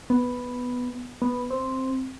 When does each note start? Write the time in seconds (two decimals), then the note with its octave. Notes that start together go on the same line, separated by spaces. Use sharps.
0.10 B3
1.22 B3
1.50 C4